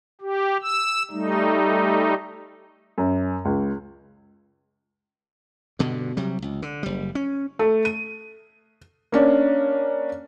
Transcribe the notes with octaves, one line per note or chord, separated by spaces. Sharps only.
G4
E6
G3 A3 D#4
F#2
C#2
G2 B2 D3
C3 F#3 G3
C#2
D3
F#1 G3
C#4
A3
D#7
A#3 C#4 D4